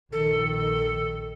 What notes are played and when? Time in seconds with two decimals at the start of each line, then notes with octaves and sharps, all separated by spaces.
0.13 A#1 D#3 A4